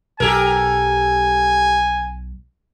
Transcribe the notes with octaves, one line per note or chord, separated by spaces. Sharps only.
B1 F#3 G4 A4 A#4 G#5